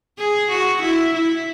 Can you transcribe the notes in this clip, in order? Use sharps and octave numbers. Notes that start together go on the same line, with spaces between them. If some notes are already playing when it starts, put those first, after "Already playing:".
G#4
F#4
E4
E4